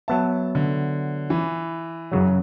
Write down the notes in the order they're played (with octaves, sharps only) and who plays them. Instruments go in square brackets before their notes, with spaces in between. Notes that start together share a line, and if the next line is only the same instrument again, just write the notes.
[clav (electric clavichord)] F#3 B3 E5 [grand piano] A5
[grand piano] D3
E3
[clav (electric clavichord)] F#2 C#3 F#3